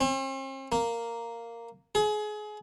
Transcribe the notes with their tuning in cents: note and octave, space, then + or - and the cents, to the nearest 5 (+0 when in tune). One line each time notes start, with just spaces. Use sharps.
C4 +45
A#3 -5
G#4 +30